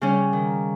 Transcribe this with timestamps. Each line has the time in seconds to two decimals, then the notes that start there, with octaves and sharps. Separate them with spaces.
0.01 C#3 G3 C#4
0.33 D#3